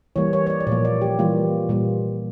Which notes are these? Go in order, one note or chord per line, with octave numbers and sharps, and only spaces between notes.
E3 G3 A#3 C#5
C#5
C#5
D5
D5
A#2 F3 A#3 C#5
D5
G4
E3 G3 A#3 F4
A#2 G3 A#3